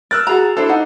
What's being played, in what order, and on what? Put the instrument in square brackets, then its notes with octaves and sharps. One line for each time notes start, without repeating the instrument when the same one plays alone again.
[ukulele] A#4 [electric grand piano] E6 F#6 A6
[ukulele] F#4 G#4 A#5
[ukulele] D4 E4 C5 [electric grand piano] A4
[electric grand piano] D#4 [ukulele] F#5